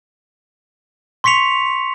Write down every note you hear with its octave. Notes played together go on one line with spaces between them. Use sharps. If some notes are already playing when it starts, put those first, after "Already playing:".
C6 C#6 B6 C#7 F7